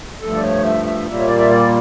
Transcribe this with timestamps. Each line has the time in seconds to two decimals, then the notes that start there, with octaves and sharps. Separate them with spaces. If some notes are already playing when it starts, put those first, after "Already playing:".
0.21 G2 F3 A3 A4
0.36 D5
0.43 C#5
0.64 E5
0.85 E5
1.06 A#2 G3 A#3 E5
1.20 C#5
1.28 D5
1.39 E5
1.50 D5